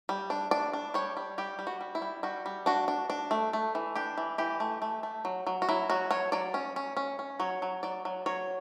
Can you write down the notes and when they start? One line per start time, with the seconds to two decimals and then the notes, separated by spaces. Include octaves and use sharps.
0.09 G3
0.30 D4
0.51 D4 D5
0.73 D4
0.94 G3 C#5
1.17 G3
1.38 G3 G4
1.59 G3
1.67 F#4
1.81 G3
1.95 E4
2.02 G3
2.23 G3 F#4
2.46 G3
2.66 D4 F#4
2.88 D4
3.10 D4
3.31 A3
3.53 A3
3.75 E3
3.95 D4 G4
4.18 E3
4.38 E3 G4
4.60 A3
4.82 A3
5.03 A3
5.25 F#3
5.47 F#3
5.62 F#4
5.69 F#3 E4
5.90 F#3 F#4
6.11 F#3 C#5
6.32 F#3 D5
6.54 C#4
6.76 C#4
6.97 C#4
7.19 C#4
7.40 F#3 C#5
7.62 F#3
7.83 F#3 D5
8.05 F#3
8.26 F#3 C#5